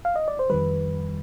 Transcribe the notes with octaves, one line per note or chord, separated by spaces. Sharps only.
F5
D#5
D5
C5
F2 D#3 G3 B4